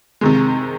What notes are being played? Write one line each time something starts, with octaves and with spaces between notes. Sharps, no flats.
C3 D#3 G#3